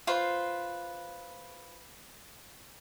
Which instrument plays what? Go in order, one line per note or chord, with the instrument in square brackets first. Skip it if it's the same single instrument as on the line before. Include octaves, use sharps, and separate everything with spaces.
[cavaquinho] F4 B4 C5